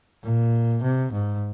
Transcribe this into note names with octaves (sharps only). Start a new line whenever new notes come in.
A#2
C3
G#2